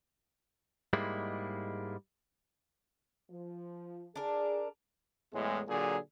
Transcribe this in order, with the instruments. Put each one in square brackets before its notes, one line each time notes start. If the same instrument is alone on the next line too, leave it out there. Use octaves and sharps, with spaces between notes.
[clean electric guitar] G#2 G3 G#3 A#3 E4
[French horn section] F3
[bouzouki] D4 A#4 [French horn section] G#4
[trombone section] E2 A2 G#3
A#2 D3 F#3 G#4